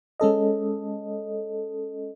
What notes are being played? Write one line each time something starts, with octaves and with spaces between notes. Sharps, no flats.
G#3 C#4 A4 D#5